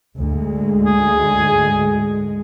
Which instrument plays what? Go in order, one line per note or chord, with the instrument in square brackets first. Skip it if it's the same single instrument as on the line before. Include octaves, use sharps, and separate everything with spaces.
[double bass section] D2 G#2 G#3
[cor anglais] G#4